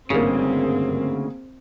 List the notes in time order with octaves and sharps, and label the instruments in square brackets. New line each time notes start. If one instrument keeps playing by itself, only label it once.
[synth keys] G#1 G2 [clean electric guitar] D2 C#3 [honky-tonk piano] A#3 G#4 [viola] C4